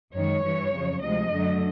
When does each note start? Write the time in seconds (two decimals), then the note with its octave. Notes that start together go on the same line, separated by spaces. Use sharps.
0.13 F#2 D#3 G#3 C#5
0.44 G2 E3 G3
0.73 F2 C#3 F#3
1.01 D2 C3 F3 G#3 D#5
1.30 F#2 D3 F#3 A3